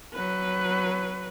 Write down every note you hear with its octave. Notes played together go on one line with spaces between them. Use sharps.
F#3 B4